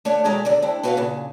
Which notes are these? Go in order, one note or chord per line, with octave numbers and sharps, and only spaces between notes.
A3 D4 C#5 D5 F#5
B2 D#3 G#3 A3 D5 A#5
E2 D3 D5
C4 D4 E4
B3 F#4 B4 D5 F5 F#5
A#2 C#3